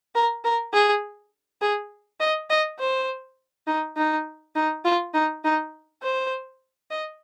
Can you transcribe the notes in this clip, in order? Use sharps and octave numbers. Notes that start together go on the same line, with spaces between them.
A#4
A#4
G#4
G#4
D#5
D#5
C5
D#4
D#4
D#4
F4
D#4
D#4
C5
D#5